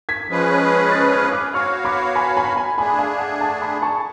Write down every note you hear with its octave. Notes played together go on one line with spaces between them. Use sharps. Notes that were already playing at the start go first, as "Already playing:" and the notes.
G#6 B6
F3 G#3 C#4 G#4 B4
F#6 A6
F6 G#6
F6
D6 F#6
B3 F#4 C#5 F5 C#6 F6
B5 D6
G#5 B5
G#5 B5
G#5 B5
A3 D4 G#4 G#5 B5
F5 G#5
F#5
F#5 A5
G#5 B5
A5 C#6